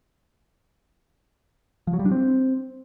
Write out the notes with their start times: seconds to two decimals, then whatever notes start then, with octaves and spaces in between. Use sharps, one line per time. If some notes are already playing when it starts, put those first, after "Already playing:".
1.87 F3
1.93 F#3
1.99 G3
2.05 D4
2.12 C4